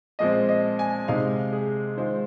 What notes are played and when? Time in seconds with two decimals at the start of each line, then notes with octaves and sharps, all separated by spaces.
0.19 A#2 F3 G#3 C4 D#5
0.49 D#5
0.79 G#5
1.08 C3 G#3 D#4 F5
1.53 G#4
1.97 D#3 G#3 F4 C5